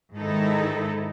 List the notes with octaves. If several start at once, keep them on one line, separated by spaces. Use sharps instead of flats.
G#2 D#3 D#4 E4 A4